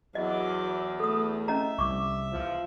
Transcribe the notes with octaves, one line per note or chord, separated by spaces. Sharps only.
E2 F#3 D#5 D6
A3 A4 D#6
C#4 D#5 E5 A#5
C2 C#6 D6
E2 F3